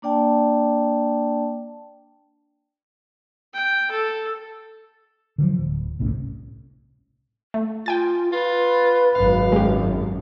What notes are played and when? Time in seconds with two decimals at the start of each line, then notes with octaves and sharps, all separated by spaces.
0.02 A#3 D4 D5 G5 A5
3.53 G5
3.91 A4
5.38 D3 F3 F#3
5.59 D1
5.99 G1 C2 A2 C#4
7.54 A3
7.86 F4 G5 G#5 A6
8.32 F4 B4
9.15 G#1 F#2 F5
9.52 G#3 G4